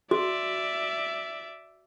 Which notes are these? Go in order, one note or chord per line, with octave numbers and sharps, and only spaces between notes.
F#4 D5 E5